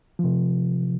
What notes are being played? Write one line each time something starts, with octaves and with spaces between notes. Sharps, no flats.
C3 F3